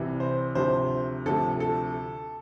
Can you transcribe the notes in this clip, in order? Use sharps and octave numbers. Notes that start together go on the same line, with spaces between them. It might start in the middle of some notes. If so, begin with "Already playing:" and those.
Already playing: C2 C3 E3
C5
D2 C3 F3 A3 C5
D2 C3 F3 A3 A4
A4